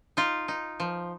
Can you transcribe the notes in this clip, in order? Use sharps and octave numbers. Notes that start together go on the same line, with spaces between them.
D#4 F4
D#4
F3